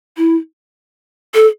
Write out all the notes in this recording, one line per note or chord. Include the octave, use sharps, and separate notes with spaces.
E4
A4